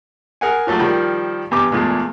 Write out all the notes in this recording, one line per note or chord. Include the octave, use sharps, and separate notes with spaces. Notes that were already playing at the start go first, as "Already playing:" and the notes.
G#4 A#4 F#5 G#5
F3 F#3 A3 A#3 F#4
D#3 F3 G3
E2 G2 G4 D6
E2 A#2 G#3 A3